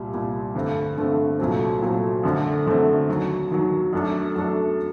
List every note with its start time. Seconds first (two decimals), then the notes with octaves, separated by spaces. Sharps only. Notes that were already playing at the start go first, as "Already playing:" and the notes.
Already playing: C2 A#2 G3
0.13 C2 A#2 G3
0.55 G2 D3 A3 C4
0.97 G2 D3 A3 C4
1.39 C2 A#2 F#3 A3 C4
1.82 C2 A#2 F#3 A3 C4
2.23 F#2 D3 A3 C4
2.66 F#2 D3 A3 C4
3.08 D#2 D#3 F#3
3.51 D#2 D#3 F#3
3.93 F#2 F#3 A3 D4 A4
4.35 F#2 F#3 A3 D4 A4